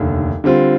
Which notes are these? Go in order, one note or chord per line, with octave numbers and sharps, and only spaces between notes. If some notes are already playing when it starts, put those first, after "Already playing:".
Already playing: F1 D#2 D3
D3 G3 C4 F4